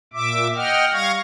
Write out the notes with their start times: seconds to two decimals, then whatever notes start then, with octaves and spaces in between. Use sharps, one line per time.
0.13 A#2 E5 D6
0.56 D#5 F#5 G5 F6
0.93 G3 F5 C#6 G#6 A#6